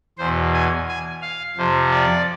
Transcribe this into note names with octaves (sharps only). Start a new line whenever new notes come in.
E2 B2 C5
G#5
G#5
F5
F2 C3 F3
D5